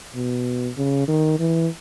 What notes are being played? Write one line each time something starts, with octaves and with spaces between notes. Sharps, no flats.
B2
C#3
D#3
E3